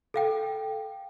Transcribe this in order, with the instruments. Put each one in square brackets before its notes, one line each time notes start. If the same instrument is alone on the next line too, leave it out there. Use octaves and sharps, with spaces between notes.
[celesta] A4 F5 G5